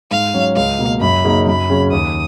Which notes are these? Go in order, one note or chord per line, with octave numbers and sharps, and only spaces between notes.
G#2 F5
F#3 C#4
C#2 F5
B2 A#3
F#2 B5
C#3 F#3 A#3 D#4
F#2 B5
C#3 F#3 C#4
D#2 D#6